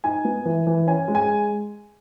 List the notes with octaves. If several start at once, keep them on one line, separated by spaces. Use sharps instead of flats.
D#4 G#5
B3
E3
E3
C#4 G#5
G#3
G#5